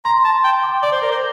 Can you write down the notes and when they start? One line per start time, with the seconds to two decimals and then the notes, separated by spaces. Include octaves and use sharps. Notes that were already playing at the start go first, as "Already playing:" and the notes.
0.05 A#5 C6
0.24 A5
0.44 G5
0.63 D6
0.83 D5 D6
0.92 C5
1.02 A#4
1.12 C5